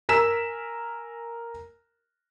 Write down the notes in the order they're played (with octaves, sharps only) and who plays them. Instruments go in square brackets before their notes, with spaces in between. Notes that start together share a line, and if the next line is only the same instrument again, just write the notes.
[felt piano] A#4 G#5 A#5 E6 B6 E7